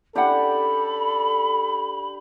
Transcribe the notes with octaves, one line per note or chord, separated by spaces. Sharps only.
C#4 D4 E4 G4 A4 D5 F#5 B5